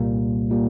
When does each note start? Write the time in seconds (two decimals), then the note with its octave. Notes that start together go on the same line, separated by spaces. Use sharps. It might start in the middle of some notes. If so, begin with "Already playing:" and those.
Already playing: C2 A#2 G3 A#3
0.50 A#2 G3 A#3